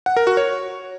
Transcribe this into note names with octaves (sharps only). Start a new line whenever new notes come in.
F#5
A#4
F#4
C#5